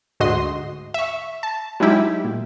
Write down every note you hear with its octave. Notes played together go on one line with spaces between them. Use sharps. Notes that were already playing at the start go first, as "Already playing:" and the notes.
D2 G#2 F#4 D#5 C6
E5 C#6
A5
F#3 G#3 D#4 E4 G4
A#2